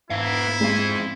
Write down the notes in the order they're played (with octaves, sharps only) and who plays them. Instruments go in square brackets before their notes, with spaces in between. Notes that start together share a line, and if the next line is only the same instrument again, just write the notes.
[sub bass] G#2 [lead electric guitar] B3 F5 [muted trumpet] E4
[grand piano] G#3 [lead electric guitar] C4 F5